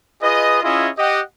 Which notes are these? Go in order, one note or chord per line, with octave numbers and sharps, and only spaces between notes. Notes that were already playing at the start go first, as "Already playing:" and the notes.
F4 G#4 B4 D#5
C#4 E4 F4 G#4 D#5 E5
G4 D#5 F#5